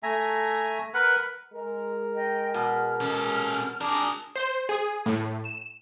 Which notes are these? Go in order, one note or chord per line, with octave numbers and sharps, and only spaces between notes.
A3 E5 G#5 A#5
A#4 B4 F#5 B5
G#3 A#4
D#5 G5
B2 F6
C#4 A4
D4 G#4 A#4 A#5 D#6
C5
G#4
A2
E7